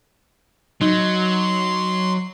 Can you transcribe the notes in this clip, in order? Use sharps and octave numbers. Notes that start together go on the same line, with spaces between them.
F#3 D#4 C6